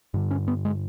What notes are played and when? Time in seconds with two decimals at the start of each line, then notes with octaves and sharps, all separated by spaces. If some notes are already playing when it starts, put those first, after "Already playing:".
0.14 G2 D3
0.31 C#4
0.48 B3
0.65 G#3